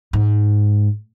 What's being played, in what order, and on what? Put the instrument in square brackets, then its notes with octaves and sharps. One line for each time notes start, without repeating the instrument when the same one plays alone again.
[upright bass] G#2